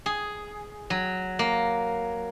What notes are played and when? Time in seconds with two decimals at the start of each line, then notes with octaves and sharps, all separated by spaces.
0.06 G#4
0.90 F#3
1.39 A#3